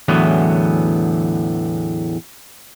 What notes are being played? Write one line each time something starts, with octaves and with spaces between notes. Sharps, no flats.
E2 A2 D3 E3 F#3 B3